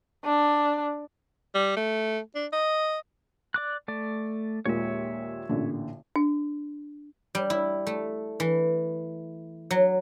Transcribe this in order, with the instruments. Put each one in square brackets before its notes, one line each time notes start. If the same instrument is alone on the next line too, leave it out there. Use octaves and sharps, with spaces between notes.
[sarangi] D4
[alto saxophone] G3
A3
D4
D#5
[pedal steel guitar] D5 D6 F#6
A3 D5
[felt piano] D#2 A#2 G#3 [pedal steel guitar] C#5 E5
[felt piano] A1 A#2 D3
[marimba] D4
[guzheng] G3
E4
A3
E3
F#3